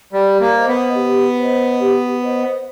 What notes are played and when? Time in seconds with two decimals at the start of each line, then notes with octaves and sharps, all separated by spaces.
0.13 G3 G4
0.41 A#3
0.54 C5 D#5
0.68 B3
0.95 G4
1.38 C5 D#5
1.79 G4
2.22 C5 D#5